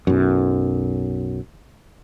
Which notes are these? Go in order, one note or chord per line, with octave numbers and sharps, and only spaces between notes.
B1 F#2